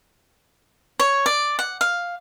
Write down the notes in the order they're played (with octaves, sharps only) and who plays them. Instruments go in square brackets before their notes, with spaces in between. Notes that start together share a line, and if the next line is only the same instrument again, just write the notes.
[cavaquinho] C#5
D5
F#5
F5